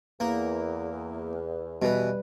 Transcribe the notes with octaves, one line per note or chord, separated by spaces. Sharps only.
E2 A#3
B2 E3 G3 B4